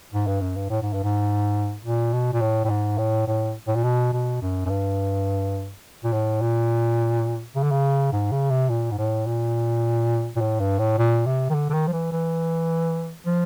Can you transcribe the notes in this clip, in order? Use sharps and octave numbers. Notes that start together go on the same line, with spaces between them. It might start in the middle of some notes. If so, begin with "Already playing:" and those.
G#2
G2
F#2
G2
A2
G#2
G2
G#2
A#2
B2
A#2
A2
A2
G#2
A2
A2
A2
A#2
B2
B2
F#2
F#2
G2
A#2
A2
A#2
C#3
D3
C#3
G#2
C#3
C3
A#2
G#2
A2
A#2
A#2
A2
G2
A2
A#2
C3
D#3
D3
D3
D#3
F3
E3
E3
F3